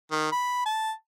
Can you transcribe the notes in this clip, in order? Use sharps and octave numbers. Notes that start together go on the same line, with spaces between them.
D#3
B5
A5